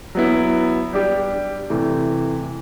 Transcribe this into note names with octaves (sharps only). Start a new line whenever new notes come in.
F#3 B3 E4
G3 D4 G4
C3 E3 A3